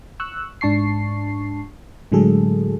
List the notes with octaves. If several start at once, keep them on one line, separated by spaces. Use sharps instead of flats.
C#6 E6 F#6
G#2 D4 A5 C#6 C7
A2 D3 F#3 G#3 G#4 A4